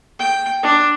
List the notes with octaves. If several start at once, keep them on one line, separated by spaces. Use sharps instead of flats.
G5
D4